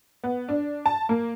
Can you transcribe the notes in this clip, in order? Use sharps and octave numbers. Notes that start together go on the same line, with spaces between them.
B3
D4
A5
A#3